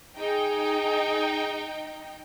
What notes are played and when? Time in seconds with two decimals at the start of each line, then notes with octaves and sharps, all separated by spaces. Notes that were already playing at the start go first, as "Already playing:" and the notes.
0.18 D#4 G#4 G5